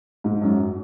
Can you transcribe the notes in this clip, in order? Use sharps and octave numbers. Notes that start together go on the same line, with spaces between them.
G#2
F#2